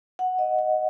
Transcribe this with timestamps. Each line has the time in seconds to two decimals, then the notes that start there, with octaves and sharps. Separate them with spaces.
0.19 F#5
0.39 D#5
0.59 D#5